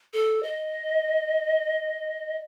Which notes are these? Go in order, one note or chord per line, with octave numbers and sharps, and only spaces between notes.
A4
D#5